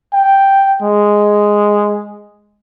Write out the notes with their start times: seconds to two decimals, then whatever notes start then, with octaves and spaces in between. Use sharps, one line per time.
0.14 G5
0.82 G#3